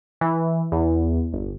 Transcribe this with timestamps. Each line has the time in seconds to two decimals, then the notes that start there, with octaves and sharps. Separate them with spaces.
0.21 E3
0.72 E2
1.33 G1